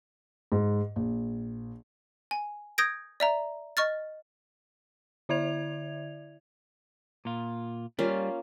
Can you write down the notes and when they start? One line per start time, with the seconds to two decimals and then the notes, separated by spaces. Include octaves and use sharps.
0.52 G#2
0.96 A#1
2.31 G#5
2.78 D#6 G6 G#6 A#6 D7
3.20 D5 E5 A#5
3.77 D#5 C#6 F6 A6
5.29 D3 E4 D5 E5 G#6 F7
7.25 A#2 F4
7.99 G3 A#3 C#4 F4